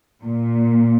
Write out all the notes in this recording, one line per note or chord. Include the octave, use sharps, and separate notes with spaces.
A#2